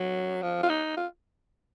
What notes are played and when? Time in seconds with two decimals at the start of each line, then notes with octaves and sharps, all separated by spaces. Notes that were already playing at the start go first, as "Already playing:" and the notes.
Already playing: F#3
0.43 F3
0.63 F4
0.69 D#4
0.97 F4